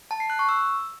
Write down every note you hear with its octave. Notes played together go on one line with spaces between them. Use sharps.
A5
C7
F#6
C#6
E6